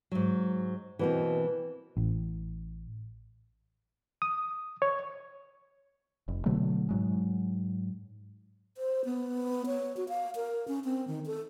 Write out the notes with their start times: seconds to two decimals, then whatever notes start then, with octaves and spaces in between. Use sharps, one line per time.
0.12 G#2 F#3
0.99 B2 E3 A#3 C4
1.97 A1
4.22 D#6
4.82 C#5
6.28 F1
6.46 B2 D3 F#3 A3
6.89 G#2 F#3 G#3
8.78 C5
9.05 B3
9.66 C#5
9.97 F#4
10.09 F5
10.36 A#4
10.68 C#4
10.85 C4
11.08 D#3
11.26 A4